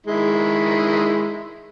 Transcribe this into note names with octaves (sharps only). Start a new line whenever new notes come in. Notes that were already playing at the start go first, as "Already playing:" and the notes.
D#3 G#3 E4